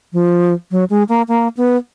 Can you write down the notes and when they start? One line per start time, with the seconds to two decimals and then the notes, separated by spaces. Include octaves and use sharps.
0.13 F3
0.71 F#3
0.90 G#3
1.09 A#3
1.28 A#3
1.57 B3